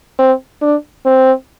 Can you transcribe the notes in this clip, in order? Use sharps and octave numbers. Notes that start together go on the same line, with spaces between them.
C4
D4
C4